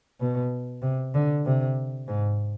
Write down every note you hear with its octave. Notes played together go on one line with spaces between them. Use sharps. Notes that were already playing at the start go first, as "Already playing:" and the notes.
B2
C3
D3
C3
G#2